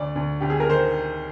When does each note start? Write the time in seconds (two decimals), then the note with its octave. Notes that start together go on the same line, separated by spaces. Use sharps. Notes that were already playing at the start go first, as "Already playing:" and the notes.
Already playing: D2 D5
0.16 D2
0.40 D2 G4
0.50 G#4
0.60 A#4
0.69 D#3 C5